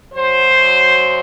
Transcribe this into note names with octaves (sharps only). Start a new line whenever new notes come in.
F#2 F#3 C5